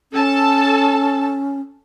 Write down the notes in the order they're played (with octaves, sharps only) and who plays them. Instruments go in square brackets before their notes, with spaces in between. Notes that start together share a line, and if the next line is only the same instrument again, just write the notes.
[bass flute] C#4 [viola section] A4 A5